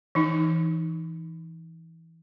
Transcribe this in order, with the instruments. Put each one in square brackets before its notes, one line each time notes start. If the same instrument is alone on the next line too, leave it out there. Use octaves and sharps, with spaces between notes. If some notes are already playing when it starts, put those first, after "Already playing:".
[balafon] E3 D#4